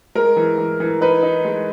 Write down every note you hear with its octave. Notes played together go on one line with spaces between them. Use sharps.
G#3 A#4
E3
E3
E3
D#4 B4
D#4
G#3